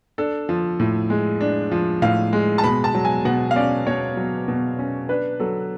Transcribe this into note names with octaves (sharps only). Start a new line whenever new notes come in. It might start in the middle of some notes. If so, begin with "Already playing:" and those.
D4 A4
F3
A2
G#3
D4
F3
A2 F5
G#3
A5
B2 B5
A5
F#3
G#5
B2 F#5
F5
C#4 D5
B2 C#5
F#3
B2
C#4
D4 B4
F#3 A4